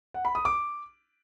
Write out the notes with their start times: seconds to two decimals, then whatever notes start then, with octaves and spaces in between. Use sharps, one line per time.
0.14 F#5
0.25 B5
0.35 D#6
0.45 D6